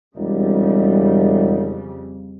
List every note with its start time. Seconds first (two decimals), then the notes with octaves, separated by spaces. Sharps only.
0.15 E1 F2 C#3 G3